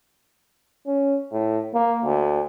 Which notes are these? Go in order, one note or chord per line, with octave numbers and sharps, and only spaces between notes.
C#4
A2
A#3
D2